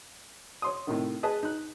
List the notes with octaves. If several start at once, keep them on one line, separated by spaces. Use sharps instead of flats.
C#5 C6 D#6
A2 C3 D#3
G#4 B4 D#5 A5
D#4 F#6